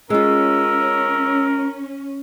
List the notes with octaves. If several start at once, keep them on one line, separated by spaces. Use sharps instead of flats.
G#3 C#4 F4 A#4 E6